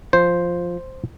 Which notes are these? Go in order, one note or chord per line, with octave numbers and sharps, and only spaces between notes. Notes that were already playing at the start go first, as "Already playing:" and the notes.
F3 C5